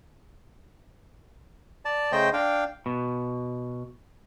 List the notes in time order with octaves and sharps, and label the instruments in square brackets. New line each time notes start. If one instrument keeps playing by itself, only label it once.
[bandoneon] D5 A5
C#3 A3 C5 D#5 G5 G6
D4 F5 G5
[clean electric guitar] B2